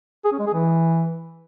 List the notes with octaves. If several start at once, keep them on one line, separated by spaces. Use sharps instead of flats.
G#4
C#4
G#3
G#4
E3